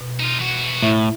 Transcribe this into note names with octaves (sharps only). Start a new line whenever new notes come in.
B2
D#4 F4
E3 F#4
A2 E4 E5